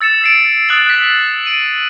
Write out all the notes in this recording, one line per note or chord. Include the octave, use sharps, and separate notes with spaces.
E6 A6 C#7 E7
A6 C7 D7
D#6 F#6 A6 D7 F#7
F#6 B6
D7 D#7 F#7